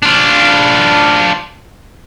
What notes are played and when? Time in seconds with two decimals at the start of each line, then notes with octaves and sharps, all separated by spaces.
0.03 D4 F4